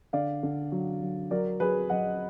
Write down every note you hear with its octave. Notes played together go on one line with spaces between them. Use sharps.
D3 D5 F5
D3
F#3
F#3
F#3 A#4 D5
F#3 G#4 B4
F#3 D#5 F#5